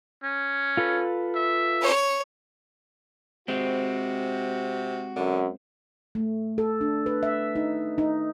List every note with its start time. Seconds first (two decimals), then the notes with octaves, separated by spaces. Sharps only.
0.24 C#4
0.77 F4 A4 B4
1.35 E5
1.82 C#5
3.48 C3 G#3 C4 F#4
5.16 F#2 D3
6.15 A3
6.58 A4
6.81 D4
7.06 B4
7.23 E5
7.56 D#4
7.98 D#4